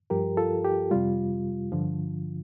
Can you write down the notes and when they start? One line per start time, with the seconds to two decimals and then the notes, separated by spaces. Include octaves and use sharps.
0.10 G2 F3 G4 A#4
0.37 F4 A4
0.64 G4
0.91 F2 C3 G3 F4
1.72 G2 D3 F3